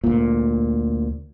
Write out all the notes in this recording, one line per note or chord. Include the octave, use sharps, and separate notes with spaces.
D2 A#2